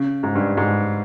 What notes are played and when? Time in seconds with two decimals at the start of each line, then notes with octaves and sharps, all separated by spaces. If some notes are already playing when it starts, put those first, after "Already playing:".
Already playing: C#3
0.23 G#2
0.35 G2
0.57 G#2